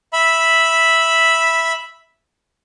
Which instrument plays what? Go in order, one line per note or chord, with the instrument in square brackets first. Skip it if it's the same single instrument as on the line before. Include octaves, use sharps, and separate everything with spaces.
[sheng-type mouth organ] E5 B5